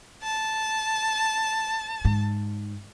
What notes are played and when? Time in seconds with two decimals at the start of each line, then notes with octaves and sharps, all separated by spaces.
0.22 A5
2.05 G#2